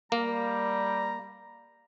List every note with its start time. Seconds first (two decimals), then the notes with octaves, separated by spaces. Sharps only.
0.12 G3 A#3 A#5